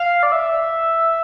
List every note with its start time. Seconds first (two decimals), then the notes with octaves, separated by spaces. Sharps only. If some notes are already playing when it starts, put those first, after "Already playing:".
Already playing: F5
0.23 D5
0.32 E5